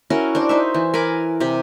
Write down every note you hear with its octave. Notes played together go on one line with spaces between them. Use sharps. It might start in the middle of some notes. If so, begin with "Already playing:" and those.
C#4 E4 F#4 A#4
D4 C5 D5
D#4 C5 E5
E3
A#4 G#5 B5 D6
C3 G4